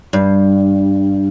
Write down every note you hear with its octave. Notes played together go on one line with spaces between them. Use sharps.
G2